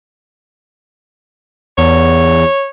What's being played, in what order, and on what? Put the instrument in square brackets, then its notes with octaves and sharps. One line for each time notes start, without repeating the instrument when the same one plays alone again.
[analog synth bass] E2 [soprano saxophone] C#5